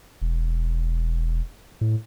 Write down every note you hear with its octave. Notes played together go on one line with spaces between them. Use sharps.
E1
A2